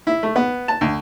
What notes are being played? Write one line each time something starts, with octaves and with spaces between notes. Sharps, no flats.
E4
A3
B3
A5
D2